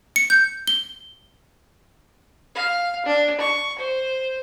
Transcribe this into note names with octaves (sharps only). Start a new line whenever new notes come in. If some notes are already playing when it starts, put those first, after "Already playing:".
C#7
G6
G7
F5
D4
C#6
C5